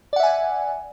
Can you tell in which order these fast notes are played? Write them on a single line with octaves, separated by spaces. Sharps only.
D5 F#5 E5 G#5